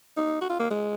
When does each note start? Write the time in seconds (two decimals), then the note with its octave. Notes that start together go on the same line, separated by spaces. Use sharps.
0.17 D#4
0.41 F#4
0.49 F4
0.59 A#3
0.70 G#3